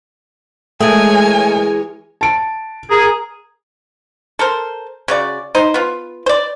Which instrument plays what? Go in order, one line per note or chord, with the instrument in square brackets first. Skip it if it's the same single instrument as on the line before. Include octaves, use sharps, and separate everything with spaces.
[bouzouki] E3 G#4 [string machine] G#3 A#4 C#5 [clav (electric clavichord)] A3 [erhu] G#5
[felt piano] A5 D7
[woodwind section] G#4 [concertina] A#4 A#5
[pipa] A4 A#4 C5
C#3 F#4 D5
D#4 C5
B3 F4
C5 D5